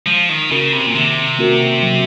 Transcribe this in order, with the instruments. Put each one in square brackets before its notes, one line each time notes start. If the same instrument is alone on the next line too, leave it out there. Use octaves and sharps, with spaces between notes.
[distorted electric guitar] F3 [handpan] G#3
[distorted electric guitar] D#3
[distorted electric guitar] C#3 [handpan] C#4 F#4 A#4
[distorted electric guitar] C3
A#2
[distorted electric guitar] C3 [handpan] D#3
[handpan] A#3 C#4 F#4 A#4
F#3